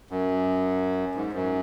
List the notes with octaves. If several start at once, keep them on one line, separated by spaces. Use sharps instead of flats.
F#2
G#2
F#2